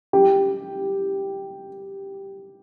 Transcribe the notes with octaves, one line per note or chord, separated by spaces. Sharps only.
G4